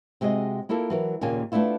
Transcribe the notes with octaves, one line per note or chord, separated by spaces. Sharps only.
C3 G#3 F#4 G#4 D#5
A#3 E4 F4 A4 A#4
E3 F#3 A#4
D#2 A#2 C#3 A#3 G#5
A3 B3 D4 E4 F4